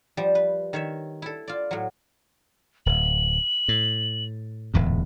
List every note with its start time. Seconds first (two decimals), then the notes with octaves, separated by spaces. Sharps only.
0.17 F3 G3
0.35 B4
0.73 D#3 C#5 E5
1.22 E4 A4
1.48 F4 D5
1.71 A2 F#3
2.86 D1 F#7
3.68 A2
4.74 D1 E2 G#2